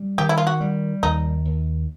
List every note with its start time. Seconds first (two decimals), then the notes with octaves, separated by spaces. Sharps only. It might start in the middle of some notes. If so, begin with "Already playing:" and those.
Already playing: G3
0.18 D#3 G4
0.29 E4
0.38 F4
0.47 F#4
0.60 G3
1.03 D#2 D#4
1.45 D#2